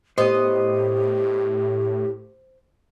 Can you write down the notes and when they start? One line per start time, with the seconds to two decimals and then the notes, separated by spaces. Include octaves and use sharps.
0.18 A2 B3 G4 C5 D#5